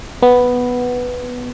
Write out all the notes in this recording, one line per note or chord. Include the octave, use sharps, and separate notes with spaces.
B3